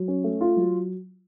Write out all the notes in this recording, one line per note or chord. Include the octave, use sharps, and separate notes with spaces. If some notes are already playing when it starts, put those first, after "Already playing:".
Already playing: F#3
C#4
A3
F4
F#3